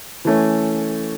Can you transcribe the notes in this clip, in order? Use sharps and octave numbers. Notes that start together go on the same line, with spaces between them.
E3 A3 C#4